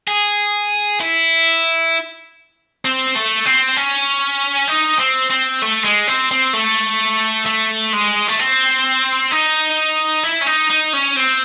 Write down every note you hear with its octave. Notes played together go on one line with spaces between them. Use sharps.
G#4
E4
C4
A3
C4
C#4
D#4
C4
C4
A3
G#3
C4
C4
A3
A3
G#3
A3
C4
D#4
E4
C#4
D#4
D#4
C#4
C4